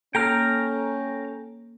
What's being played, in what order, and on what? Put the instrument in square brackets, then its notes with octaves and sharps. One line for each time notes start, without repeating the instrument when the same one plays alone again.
[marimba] A#3 [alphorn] C#4 [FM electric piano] A4 [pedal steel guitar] G5 A#5 F6